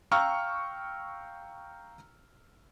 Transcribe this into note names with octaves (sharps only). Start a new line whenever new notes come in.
F5 G5 A#5 C#6 E6 F6